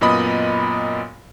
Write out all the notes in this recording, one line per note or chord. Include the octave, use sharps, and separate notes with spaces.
F#2 A#2 B3 D#5 B5 D#6